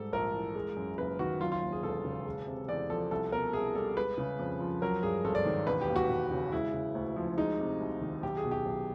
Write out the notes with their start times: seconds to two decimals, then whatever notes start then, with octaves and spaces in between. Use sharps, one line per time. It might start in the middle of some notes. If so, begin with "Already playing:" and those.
Already playing: G#2 G3 A4
0.12 A#1 A#4
0.34 E3
0.55 G#3
0.76 F#2
0.98 F#1 B4
1.19 D#3 F#4
1.40 F#3 F4
1.52 F4
1.62 D#2
1.72 G#4
1.83 E1 A4
2.05 C#3
2.26 G#3
2.47 C3
2.68 E2 D5
2.89 F3 A4
3.11 C2 A4
3.32 B2 A#4
3.53 C2 G#4
3.75 G3 A4
3.97 G#3 B4
4.18 C#3
4.39 F2
4.60 F3
4.82 F#3 A#4
5.03 G2 G#4
5.24 G#1 A4
5.35 D5
5.45 D#3
5.67 E1 B4
5.81 G4
5.88 D#2
5.96 F#4
6.09 E1
6.31 C#3
6.52 G#3 E4
6.74 C#3
6.95 D2
7.16 F3
7.37 G#3 D#4
7.59 C3
7.80 C2
8.01 D#3
8.23 B1 G4
8.37 G#4
8.44 B2
8.51 G4
8.66 B1